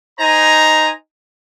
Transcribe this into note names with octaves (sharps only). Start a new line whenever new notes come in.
D#4 C5 G#5 A#5